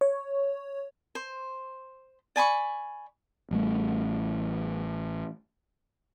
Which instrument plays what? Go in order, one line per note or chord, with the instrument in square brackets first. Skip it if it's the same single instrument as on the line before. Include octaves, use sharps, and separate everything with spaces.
[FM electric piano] C#5
[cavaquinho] C5
D5 G#5 B5 C#6
[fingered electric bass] A1 G3 A3